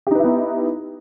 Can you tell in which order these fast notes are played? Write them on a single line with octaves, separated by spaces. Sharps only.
G4 D#4 B4 E4 B3